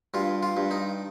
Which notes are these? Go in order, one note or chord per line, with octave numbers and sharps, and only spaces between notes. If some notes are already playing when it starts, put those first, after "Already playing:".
G2 F4
F4
G2
D#4